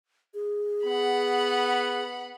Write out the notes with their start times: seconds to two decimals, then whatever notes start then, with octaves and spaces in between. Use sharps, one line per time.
0.34 G#4
0.86 B3 F#5 B5